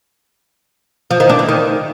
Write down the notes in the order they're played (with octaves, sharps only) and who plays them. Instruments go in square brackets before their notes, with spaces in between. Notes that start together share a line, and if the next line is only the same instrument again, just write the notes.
[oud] F3
D#3
D4
E3
D#3